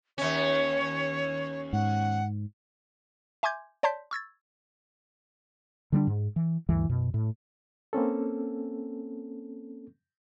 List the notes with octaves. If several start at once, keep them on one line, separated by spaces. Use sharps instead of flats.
D#2 C#4 C#5
G#2 F#5
E5 G#5 C6 D6 G6 G#6
C#5 D5 A5 C6 G6 B6
C#6 E6 G#6 A6
D3 G3 A3 D4
G#2
E3
D2 G2 E3
F#2 B2
A2
A#3 C4 C#4 A4